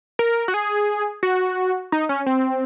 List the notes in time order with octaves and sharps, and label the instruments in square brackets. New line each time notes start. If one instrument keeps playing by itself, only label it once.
[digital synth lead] A#4
F#4
G#4
F#4
D#4
C#4
C4